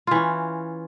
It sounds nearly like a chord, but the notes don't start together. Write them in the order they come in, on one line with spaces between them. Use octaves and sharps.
F4 E3 C#4